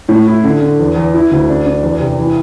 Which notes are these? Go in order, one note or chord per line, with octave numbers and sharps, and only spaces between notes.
A2
E4
D3
D3
E2
E2
E4
D2
D4
D4
E2
C3
E3